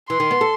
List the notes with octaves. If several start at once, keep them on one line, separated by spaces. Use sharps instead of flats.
E3 C6
D#3
B3
A4